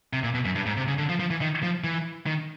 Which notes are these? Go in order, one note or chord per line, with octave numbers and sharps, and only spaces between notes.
C3
A#2
B2
F#2
G2
G#2
C3
C#3
D3
F3
F3
E3
D#3
F3
E3
D#3